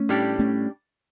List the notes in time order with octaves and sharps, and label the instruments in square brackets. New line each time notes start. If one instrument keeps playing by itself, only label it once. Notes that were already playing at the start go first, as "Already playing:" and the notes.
Already playing: [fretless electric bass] A3 C#4
[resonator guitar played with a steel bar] A2 G3 D4 G4
[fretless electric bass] A3 C#4